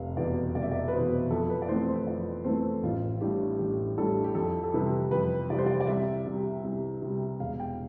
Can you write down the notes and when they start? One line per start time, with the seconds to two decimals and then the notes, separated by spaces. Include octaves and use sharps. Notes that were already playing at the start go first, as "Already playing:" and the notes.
Already playing: F1 F5
0.17 E2 B2 D5
0.55 F1 D5
0.62 E5
0.71 D5
0.88 B4
0.93 E2 B2 C5
1.30 F2 A4
1.50 B4
1.62 D5
1.69 E3 A3 C4 C5
1.88 C5
2.07 F2 D5
2.44 E3 A3 C4 C5
2.83 A1 F4
3.21 A2 G3 D4 G4
3.59 A1 G4
3.98 A2 G3 D4 A4
4.24 G4
4.35 F2 A4
4.63 A4
4.74 C3 E3 G3 B4
5.11 F2 B4
5.50 C3 E3 G3 D5
5.58 C5
5.66 D5
5.80 D5
5.87 C2 E5
6.26 C3 G3
6.64 C2
7.02 C3 G3
7.40 E1 F5
7.60 G5